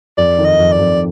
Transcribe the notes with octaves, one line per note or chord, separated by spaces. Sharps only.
F2 D5
D#3
D#5
F2
D5
F2